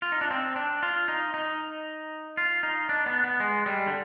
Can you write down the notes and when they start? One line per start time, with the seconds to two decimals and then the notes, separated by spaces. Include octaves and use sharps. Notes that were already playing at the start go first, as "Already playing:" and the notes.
0.02 F4
0.12 D#4
0.21 D4
0.31 C4
0.56 D4
0.83 F4
1.08 D#4
1.34 D#4
2.37 F4
2.63 D#4
2.89 D4
3.06 B3
3.24 B3
3.40 G#3
3.66 G3
3.87 D3